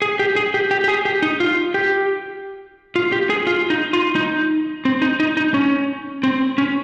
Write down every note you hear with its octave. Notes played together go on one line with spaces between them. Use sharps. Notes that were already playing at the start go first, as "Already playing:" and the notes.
G#4
G4
G#4
G4
G4
G4
G#4
G4
D#4
F4
G4
F4
G4
G#4
F4
D#4
F4
D#4
C4
D#4
D#4
D#4
C#4
C4
C#4